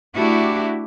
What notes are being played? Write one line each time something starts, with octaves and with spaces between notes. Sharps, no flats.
A3 D4 E4 F#4 G4